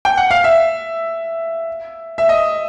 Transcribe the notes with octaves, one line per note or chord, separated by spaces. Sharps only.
G5
F#5
F5
E5
E5
D#5